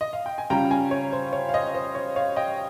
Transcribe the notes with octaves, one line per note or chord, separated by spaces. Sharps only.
D#5
F5
G5
G#5
C#3 G3 C#4 F4 G5 A#5
F5 G#5
C#5
C5
C#5
F5
C5 D#5
C5
C#5
C#5 F5
D#5 G5